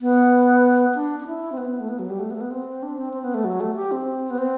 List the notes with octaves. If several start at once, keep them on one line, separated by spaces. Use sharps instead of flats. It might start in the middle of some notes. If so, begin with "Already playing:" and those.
B3
D4
D4
E4
C4
B3
A3
B3
F#3
G3
A3
B3
A3
B3
C4
D4
C4
C4
B3
A3
F#3
A3
G4
C4
B3
C4